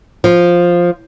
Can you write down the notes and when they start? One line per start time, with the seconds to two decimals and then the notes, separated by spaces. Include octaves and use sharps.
0.24 F3